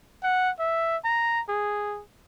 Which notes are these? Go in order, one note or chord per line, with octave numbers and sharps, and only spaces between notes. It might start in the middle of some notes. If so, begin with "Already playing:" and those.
F#5
E5
A#5
G#4